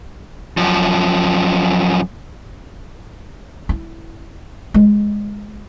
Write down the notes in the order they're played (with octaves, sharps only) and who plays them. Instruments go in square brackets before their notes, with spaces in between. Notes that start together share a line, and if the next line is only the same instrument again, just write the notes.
[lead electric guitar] F#2 F3
[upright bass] E4
G#3